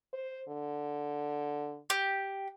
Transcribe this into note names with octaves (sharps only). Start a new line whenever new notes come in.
C5
D3
G4